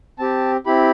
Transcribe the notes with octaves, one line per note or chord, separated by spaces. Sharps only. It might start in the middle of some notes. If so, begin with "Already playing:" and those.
C4 G4 A5
C4 E4 G4 B5